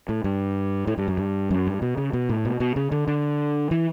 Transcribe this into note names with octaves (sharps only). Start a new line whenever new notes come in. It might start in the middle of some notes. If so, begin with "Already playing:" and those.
A2
G2
A2
G2
F#2
G2
F#2
G2
B2
C#3
B2
A2
B2
B2
C#3
D3
D3
E3